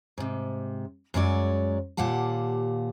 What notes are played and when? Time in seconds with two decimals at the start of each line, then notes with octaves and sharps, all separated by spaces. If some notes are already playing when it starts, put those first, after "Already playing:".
0.18 G#2 C3
1.14 F#2 F#3 G#3 C#5 D5
1.97 D#2 A#2 G4 F5 F#5 A5